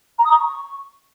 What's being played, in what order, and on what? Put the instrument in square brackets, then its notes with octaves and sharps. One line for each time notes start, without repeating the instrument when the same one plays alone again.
[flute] A#5
D#6
A#5
C#6